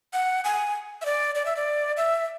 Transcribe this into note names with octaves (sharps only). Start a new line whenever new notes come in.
F#5
G#5
E5
D5
D5
E5
D5
E5